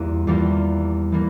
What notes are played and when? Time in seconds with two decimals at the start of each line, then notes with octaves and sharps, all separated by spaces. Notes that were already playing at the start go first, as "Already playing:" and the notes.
Already playing: E2 E3 G3 A#3 F4
0.27 E2 E3 G3 A#3 F4
1.12 E3 G3 A#3